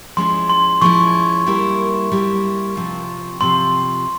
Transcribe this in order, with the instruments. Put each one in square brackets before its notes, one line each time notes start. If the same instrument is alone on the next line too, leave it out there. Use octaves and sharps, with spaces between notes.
[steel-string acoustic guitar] F3 G#3 C#4 E4 [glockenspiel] C6
[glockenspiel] C6
[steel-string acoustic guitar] F3 G#3 C#4 E4 [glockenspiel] C#6
[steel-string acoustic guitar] G3 A#3 E4 A#4
G3 A#3 E4 A#4
C3 F3 C4 F4
[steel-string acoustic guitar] C3 F3 C4 F4 [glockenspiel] C6